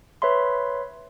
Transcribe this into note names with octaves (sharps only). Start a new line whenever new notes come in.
B4 C#5 E5 B5 C6